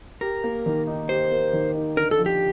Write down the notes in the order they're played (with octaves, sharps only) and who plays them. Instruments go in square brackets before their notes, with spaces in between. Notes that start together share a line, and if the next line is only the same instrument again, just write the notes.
[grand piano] G4 [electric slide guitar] A#4
[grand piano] A#3
D#3
D#4
[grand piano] G4 [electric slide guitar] C5
[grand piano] A#3
D#3
D#4
[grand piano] D3 [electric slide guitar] A#4
[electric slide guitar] A4
[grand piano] F3
[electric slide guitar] G4